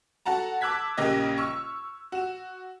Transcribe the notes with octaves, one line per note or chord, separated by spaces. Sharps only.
F#4 A4 F#5 A5 A#5
A5 D6 E6 F#6 G#6 B6
A#1 C#3 A#3 G4 D#5
C#6 E6 F6
F#4 E7